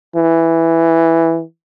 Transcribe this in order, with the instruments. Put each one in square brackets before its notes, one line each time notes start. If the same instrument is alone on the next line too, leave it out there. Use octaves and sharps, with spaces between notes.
[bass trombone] E3